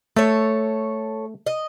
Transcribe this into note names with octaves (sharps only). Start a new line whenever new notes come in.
A3 A4 C#5
D#5